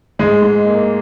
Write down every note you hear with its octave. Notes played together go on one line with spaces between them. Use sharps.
G#2 G#3
G#2
A#3